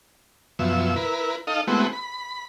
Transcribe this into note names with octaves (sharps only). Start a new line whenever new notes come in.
F#2 B2 F3 E5
E4 A#4 B4
D#4 A4 D#5 F5
G#3 A3 B3 C4 E4 F#4
B5